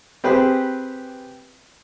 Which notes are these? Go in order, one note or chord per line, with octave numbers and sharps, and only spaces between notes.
C4 G4 G#4 B4